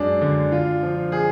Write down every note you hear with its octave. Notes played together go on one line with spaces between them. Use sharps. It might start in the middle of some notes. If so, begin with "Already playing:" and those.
Already playing: F#2 G#3 D4
D3
F4
F3
G#4